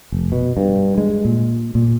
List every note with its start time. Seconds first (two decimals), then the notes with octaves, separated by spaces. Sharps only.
0.12 F1
0.32 B2
0.57 G2
0.98 G#3
1.25 A#2
1.75 A#2